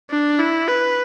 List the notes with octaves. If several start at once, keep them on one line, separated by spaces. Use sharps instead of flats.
D4
E4
B4